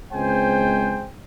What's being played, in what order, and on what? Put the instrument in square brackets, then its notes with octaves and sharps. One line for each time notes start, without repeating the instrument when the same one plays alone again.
[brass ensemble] C#2 G#3 C4 C5 G5 G#5